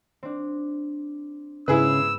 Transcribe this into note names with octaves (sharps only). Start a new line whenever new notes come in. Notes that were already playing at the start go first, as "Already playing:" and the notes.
C4 D4
G#2 C#3 B3 E4 G#4 B4 E6